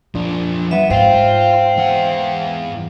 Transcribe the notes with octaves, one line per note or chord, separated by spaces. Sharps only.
F2 F3 D4
B3 E5
G#2 C4 F4 F5
E2 F#5